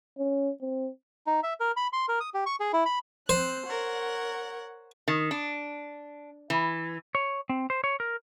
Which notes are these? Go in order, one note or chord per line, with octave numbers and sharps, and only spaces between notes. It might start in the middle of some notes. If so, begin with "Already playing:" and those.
C#4
C4
D#4
E5
A#4
B5
C6
A#4
D#6
G4
C#6
G#4
E4
B5
C4 C5 F#6
A#4 C#5 F#5
D#3
D4
E3
C#5
C4
C5
C#5
A#4